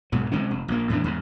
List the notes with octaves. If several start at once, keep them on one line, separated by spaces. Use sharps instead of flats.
B1 G#2 F#3
C3 G#3 C4 C#4
F1
A#1 A#3
E2 A2 E3 D4
E2 G#2